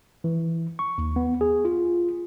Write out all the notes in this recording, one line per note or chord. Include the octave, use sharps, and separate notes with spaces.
E3
C#6
D#2
B3
G#4
F4